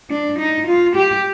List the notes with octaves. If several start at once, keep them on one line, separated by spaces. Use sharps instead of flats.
D4
D#4
F4
G4